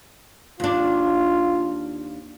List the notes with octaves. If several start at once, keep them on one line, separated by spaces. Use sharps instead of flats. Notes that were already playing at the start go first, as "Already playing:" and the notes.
D#2 D4 F4